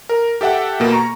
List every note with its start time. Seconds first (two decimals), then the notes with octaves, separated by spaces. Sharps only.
0.09 A#4
0.41 G4 A4 E5 F#5 G5
0.80 B2 A#3
0.93 A#5 C#6